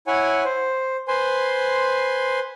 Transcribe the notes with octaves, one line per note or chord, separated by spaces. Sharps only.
E4 C#5 F#5 G#5
C5
B4 C5 G#5 C6